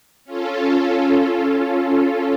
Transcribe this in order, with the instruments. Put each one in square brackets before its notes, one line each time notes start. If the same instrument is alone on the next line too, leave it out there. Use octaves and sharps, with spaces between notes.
[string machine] C#4 F4 A4